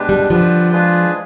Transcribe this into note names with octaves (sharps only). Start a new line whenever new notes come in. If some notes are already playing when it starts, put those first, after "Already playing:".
Already playing: B2 G#3 D4 G4 B4
G3
D3 F3 G3 D4 G4 B4
G#3 D4 F4 G#4 B4